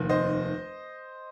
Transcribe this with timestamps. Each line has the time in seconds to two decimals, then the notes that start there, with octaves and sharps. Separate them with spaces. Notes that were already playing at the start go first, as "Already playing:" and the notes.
Already playing: F1 D#2 D#3
0.09 C5 D#5